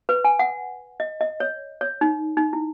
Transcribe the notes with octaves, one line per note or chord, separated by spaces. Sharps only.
B4
G#5
F#5
D#5
D#5
C#5
C#5
D#4
D#4
E4